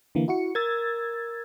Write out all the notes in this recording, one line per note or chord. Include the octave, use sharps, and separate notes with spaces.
D3 E3 A#3
E4 F#4 C#7
A#4 E6 G#6 A6